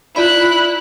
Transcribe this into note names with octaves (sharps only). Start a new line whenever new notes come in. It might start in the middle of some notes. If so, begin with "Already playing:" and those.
E4 F4 D5 B5 F#6